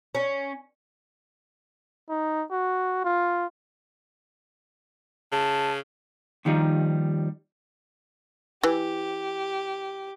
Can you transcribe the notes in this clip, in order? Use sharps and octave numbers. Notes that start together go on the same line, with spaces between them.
C#4
D#4
F#4
F4
C#3 A5
D#2 D#3 F3 G3 D#4
E3 G4